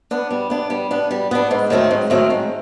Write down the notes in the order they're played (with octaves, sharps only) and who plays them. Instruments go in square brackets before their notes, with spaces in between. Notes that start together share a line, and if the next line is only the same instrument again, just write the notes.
[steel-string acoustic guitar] B3 D4
G3
B3 D4
G3
B3 D4
G3
B3 D4
G#2
D#3 F#3 A3 C4
G#2
D#3 F#3 A3 C4
G#2